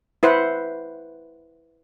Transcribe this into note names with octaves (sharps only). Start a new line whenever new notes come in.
E4 B4 C5 F#5